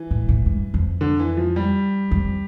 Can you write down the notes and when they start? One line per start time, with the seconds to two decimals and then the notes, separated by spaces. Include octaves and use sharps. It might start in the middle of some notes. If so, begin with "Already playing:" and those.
Already playing: E3
0.11 A2
0.28 A2
0.46 G2
0.74 F2
1.01 D3
1.19 E3
1.37 F3
1.56 G3
2.11 F2